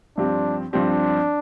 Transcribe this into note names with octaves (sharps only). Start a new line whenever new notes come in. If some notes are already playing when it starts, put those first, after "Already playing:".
G2 F3 C4 D4 G4
G2 F3 C4 D4 G4